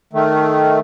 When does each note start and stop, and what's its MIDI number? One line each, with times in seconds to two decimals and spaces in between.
0.13 0.80 51
0.13 0.80 57